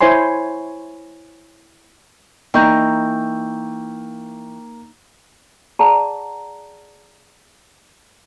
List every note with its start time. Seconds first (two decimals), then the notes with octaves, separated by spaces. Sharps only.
0.01 E4 C5 C#5 G#5 C6
2.54 E3 A#3 D#4 D#5 G5 A#5 C#6 G6
5.79 G#4 D5 F#5 A5 A#5